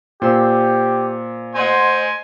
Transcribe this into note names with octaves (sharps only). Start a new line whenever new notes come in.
A#2 G4 C5 E6
C5 D#5 F#5 G#5 C6